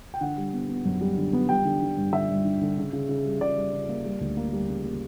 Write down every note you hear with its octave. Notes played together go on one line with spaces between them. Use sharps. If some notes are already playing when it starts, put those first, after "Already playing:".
G5
D3 F#5
G3
B3
B3
F#2
G3
D3
B3
G3 G5
D3
D3
G2
D3 E5
G2
D3
D3
C#3
C#3
C#3
G3
C#3 D5
G3
C#3
A#3
G3
D2
A#3
G3
C#3
A#3